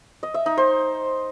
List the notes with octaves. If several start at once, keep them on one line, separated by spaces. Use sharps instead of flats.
D#5
E5
D#4
C5